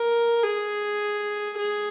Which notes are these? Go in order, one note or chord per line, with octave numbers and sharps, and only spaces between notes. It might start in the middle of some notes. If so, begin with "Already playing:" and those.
Already playing: A#4
G#4
G#4